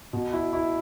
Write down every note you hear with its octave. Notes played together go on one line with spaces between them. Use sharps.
B2
E4
E4